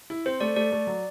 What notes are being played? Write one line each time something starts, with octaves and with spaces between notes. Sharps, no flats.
E4
C4 C5
A3 D5
A3 D5
A3
F#3